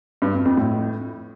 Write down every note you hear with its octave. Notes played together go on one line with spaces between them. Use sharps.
G2
F2
F2
A2